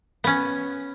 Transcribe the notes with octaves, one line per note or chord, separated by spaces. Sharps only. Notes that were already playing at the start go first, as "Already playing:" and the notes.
B3 C#4